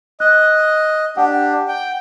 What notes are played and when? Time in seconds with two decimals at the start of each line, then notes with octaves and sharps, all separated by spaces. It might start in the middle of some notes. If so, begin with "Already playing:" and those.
0.20 D#5 F#6
1.17 D4 G4 F#5
1.68 G5